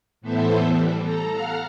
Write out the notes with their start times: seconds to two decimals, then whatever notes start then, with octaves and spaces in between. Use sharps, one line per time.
0.21 A2 E3 B3 A4 C5 E5
0.65 E3 G3
0.99 A4 A#5
1.32 F5 F#5 A#5 F6